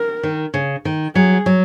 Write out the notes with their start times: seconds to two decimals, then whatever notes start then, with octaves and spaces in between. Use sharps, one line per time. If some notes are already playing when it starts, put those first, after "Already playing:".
Already playing: A#4
0.23 D#3
0.54 C#3
0.85 D#3
1.15 F#3 G#4
1.46 F#3